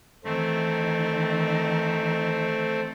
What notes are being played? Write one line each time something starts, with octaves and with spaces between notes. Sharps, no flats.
D#3 E3 A3 C4